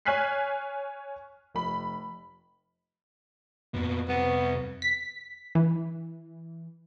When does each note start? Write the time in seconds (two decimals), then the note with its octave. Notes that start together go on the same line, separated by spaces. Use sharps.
0.05 C#5 G#5 F6 F#6 B6 C7
1.55 F1 B5
3.74 F2 A#2 B3
4.09 C3 G3 B3
4.82 B6
5.55 E3